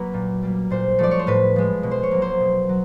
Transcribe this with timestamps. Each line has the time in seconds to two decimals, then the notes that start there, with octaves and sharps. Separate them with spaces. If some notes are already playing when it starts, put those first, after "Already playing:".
Already playing: F#3 A#3 B4
0.14 A#2
0.42 G3 A#3
0.71 A#2 C5
0.99 F3 A3 D5
1.11 C#5
1.19 C5
1.27 A2 B4
1.56 F3 G#3
1.83 B2
1.91 C5
2.03 C#5
2.11 F#3 A#3
2.22 C5
2.40 B2
2.69 F#3